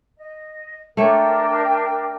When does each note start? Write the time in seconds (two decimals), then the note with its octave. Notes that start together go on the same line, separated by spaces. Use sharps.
0.18 D#5
0.97 A3 D4 A#4 C#5 G5